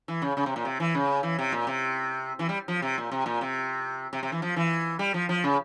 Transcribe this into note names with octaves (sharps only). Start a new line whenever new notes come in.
E3
C#3
C#3
C3
A#2
C3
E3
C#3
E3
C3
A#2
C3
E3
G3
F3
C3
A#2
C3
A#2
C3
C3
C3
E3
F3
E3
G3
F3
F3
C#3